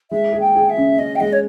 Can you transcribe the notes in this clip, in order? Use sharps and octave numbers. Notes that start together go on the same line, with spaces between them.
G#3 E5
G#4
G5
G#4
E5
C#3
C#4 D#5
G5
G#3 D#5
C#5